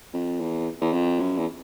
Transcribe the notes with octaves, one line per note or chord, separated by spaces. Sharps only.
F2
E2
E2
F2
F#2
E2